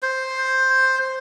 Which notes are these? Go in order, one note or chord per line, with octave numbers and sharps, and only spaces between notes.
C5